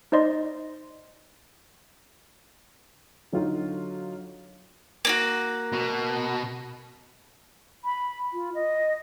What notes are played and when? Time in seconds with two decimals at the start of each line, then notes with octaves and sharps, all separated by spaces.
0.12 D#4 C5 D5 D#5 C6
3.32 D3 F#3 D#4 F4 F#4
5.05 A#3 D4 F#4
5.72 B2
7.85 B5
8.33 F4
8.55 D#5